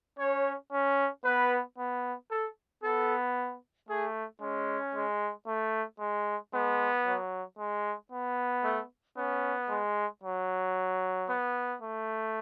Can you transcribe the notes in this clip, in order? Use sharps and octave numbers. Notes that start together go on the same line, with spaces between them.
C#4 C#5
C#4
B3 B4
B3
A4
B3 A4
A3 G#4
G#3 C#4
G#3
A3
G#3
G#3 B3
F#3
G#3
B3
A3
B3 C#4
G#3
F#3
B3
A3